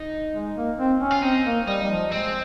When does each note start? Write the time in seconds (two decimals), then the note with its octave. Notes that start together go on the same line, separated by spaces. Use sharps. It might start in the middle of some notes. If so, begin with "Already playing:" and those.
Already playing: D#4
0.33 G#3
0.56 A#3
0.77 C4
1.00 C#4
1.11 F4
1.22 C4 D#4
1.45 A#3
1.67 G3 D#4
1.83 G3
1.89 F3
2.11 G#3 C4
2.23 G#3